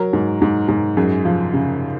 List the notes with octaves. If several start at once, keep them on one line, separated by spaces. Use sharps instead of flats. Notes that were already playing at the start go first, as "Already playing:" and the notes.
Already playing: F#3 A#4
G#2
G#2
G#2
F#2 G#4
F3
C#3